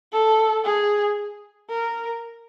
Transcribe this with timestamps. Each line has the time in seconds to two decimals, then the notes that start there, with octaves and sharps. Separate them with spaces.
0.12 A4
0.64 G#4
1.70 A#4